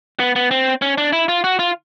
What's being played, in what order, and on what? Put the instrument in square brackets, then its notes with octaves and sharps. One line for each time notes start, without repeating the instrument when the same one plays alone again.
[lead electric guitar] B3
B3
C4
C#4
D4
E4
F4
F#4
F4